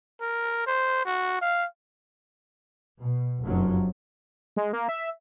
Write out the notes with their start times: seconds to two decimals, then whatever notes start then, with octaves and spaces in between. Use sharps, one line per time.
0.21 A#4
0.67 C5
1.06 F#4
1.42 F5
2.99 B2
3.43 F1 F#2 F3 F#3
4.56 G#3
4.73 A#3
4.89 E5